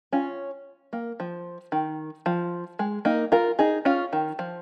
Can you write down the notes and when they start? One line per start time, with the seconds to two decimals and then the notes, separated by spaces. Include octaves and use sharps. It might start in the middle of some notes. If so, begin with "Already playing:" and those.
0.12 C#4 F4
0.93 A#3
1.20 F3
1.72 D#3
2.26 F3
2.79 G#3
3.05 A#3 D#4
3.32 F4 A#4
3.59 D#4 G#4
3.85 C#4 F4
4.13 D#3
4.39 F3